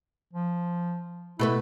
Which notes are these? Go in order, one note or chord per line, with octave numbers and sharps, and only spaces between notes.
F3
B2 A3 E4 B4